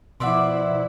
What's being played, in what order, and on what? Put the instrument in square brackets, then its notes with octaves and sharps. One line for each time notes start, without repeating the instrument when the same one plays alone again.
[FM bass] B2 [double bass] F3 E4 [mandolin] B4 D5 E5 [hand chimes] F#5 C6